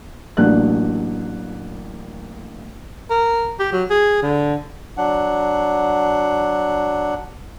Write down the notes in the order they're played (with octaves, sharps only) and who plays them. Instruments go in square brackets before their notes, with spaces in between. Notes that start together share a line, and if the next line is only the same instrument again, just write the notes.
[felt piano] A1 F#3 A#3 D4 F#6
[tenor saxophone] A#4
G4
F#3
G#4
D3
[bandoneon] F#3 D4 F#5